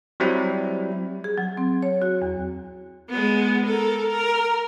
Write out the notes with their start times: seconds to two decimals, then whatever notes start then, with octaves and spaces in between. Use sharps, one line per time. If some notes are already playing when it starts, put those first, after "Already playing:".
0.20 F#3 G3 C4 E4
1.24 G#4
1.38 F#3
1.57 C4
1.83 C#5
2.02 F#4
2.22 E2
3.09 G#3 B3
3.65 A4 A#4
4.08 A#4